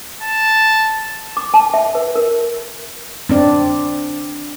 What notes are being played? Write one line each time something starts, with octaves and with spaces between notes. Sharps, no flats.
A5
D6
A5
E5
B4
A#4
C4 D4 D5